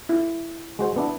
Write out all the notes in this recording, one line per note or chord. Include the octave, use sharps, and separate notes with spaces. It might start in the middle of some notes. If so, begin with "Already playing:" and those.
E4
G#3 F#4 C5
B3 D4 E4